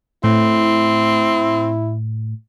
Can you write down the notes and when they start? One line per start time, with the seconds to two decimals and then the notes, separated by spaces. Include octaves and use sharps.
0.24 A2 C4 E4